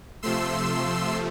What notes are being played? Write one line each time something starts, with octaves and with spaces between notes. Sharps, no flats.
C3 F3 A3 C6 E6